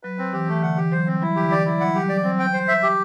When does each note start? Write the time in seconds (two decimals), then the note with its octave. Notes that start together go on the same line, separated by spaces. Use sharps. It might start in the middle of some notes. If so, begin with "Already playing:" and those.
0.03 F#3 B4
0.19 C4
0.33 E3 G4
0.48 E3 A3
0.62 D3 F#5
0.77 E3 G4
0.92 F#3 C5
1.07 G3 C4
1.22 F#3 E4
1.32 E3
1.36 D3 G4
1.50 E3 D5
1.66 F#3 E4
1.81 G3 F#5
1.89 F#3
1.95 G3 G4
2.09 F#3 D5
2.24 F#3 C4
2.39 G5
2.53 C5
2.68 E5
2.83 G4